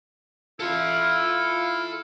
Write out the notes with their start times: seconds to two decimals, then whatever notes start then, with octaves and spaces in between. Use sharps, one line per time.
0.60 E4 F4 A4 C6
0.91 E6 F6